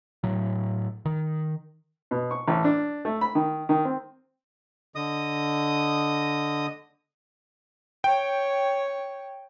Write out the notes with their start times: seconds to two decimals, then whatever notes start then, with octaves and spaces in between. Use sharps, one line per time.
0.24 A2 F#3
1.05 D#3
2.11 B2
2.31 C#6
2.48 A1
2.65 D4
3.05 A3
3.21 B5
3.35 D#3
3.69 D#3
3.85 C4
4.95 D3 D#5 D#6
8.04 C#5 G5